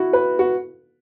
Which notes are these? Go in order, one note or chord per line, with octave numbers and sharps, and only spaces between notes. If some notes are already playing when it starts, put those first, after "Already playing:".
Already playing: E4 F#4
B4
F#4